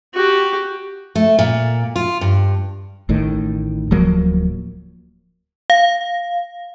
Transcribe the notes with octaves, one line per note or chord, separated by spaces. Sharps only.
F#4 G4
A3
A#2
F4
G2
A1 A2 D#3
D1 F3 F#3 A#3
F5